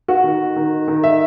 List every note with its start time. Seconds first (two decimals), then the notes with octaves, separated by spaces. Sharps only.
0.08 F#4
0.24 D#3
0.56 D#3
0.88 D#3
1.03 E5